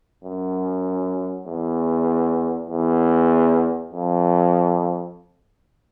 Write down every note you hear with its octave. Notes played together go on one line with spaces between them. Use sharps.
F#2
E2
E2
F2